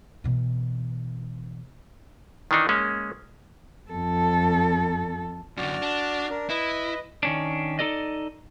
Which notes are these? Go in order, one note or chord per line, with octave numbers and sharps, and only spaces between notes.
B2 E3
D#3 E3 D4 D#4
G#3 A#3 C#4
F2 A4
F#2 D3 F#4 D5 F6
D4
D4 A#4
E4 B4 D#5
D#3 C#4 D4
D#4 G4 A4 D5 D#5